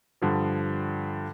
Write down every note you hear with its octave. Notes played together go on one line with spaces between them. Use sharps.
G2 D3 F3